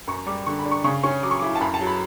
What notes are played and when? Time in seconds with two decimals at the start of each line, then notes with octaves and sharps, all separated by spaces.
0.07 F#2 C#6
0.27 G3 D6
0.46 D3 C#6
0.59 B5
0.66 D4
0.71 C#6
0.84 C#3 C#6
1.03 C#4 C#6
1.23 F#3 D6
1.31 C#6
1.40 D6
1.42 E4
1.55 A5
1.61 F#2 B5
1.74 A5
1.81 F#3
1.87 B5